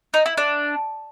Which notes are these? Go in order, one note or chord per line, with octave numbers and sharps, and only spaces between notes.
D#4
E4
D4